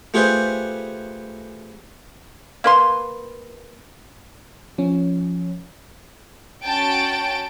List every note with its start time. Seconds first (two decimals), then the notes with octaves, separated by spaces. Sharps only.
0.14 A3 F4 G4 G#4 B4 C5
2.64 A#3 B4 C6
4.78 F3 C#4
6.63 C#4 F#4 G5 A5 D7